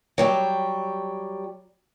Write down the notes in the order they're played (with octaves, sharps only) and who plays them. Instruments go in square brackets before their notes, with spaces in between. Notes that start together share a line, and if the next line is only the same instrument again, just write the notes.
[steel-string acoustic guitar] F#3 G3 G4